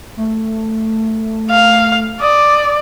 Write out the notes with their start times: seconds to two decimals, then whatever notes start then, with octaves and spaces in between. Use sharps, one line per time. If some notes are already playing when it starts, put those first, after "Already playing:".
0.17 A3
1.50 F5
2.20 D5 D#6